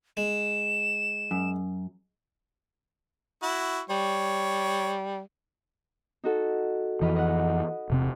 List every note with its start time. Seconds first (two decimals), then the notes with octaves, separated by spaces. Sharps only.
0.17 G#3 E7
1.31 F#2
3.43 E4 F#4
3.90 G3 C#5
6.24 D#4 F#4 A4
7.02 F2 E3 D#5 B5 F6
7.16 D#5 F#5
7.90 E1 C3 C4